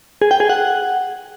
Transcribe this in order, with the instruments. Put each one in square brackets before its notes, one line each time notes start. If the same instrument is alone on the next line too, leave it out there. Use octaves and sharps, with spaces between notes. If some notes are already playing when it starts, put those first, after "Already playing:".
[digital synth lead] G#4
G5
G#4
F#5